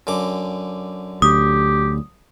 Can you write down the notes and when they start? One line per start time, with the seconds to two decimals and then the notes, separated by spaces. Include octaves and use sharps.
0.07 F#2 D3 D6
1.22 D2 G4 D#6